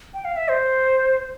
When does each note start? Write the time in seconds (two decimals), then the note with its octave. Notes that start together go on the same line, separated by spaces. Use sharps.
0.14 G5
0.25 F5
0.36 E5
0.49 C5